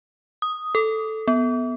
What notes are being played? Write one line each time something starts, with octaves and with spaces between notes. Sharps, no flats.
D#6
A4
B3